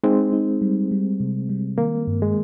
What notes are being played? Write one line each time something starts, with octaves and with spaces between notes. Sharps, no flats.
G#3 C4 D#4
D#4
G3
G3
C3
G3
D#3 A#3
G2
G#3